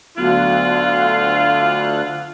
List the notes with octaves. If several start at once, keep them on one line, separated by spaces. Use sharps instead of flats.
D2 D3 F#3 B3 F4 F#4 F5 F#6